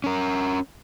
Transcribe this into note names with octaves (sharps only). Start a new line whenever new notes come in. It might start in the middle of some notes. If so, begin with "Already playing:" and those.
C#4 A#4